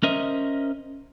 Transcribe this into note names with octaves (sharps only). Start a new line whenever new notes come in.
C#4 A#4 C5 D#5 E5